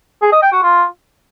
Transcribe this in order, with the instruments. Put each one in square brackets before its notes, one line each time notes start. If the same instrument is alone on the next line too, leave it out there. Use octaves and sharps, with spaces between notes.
[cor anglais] G#4
D#5
G5
F#4
F4